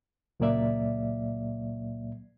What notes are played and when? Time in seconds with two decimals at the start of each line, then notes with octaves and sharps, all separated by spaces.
0.40 C#2 A#2 F#3 A#3 D5 E5